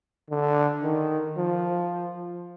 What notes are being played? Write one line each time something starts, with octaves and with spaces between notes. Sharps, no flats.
D3
D#3
F3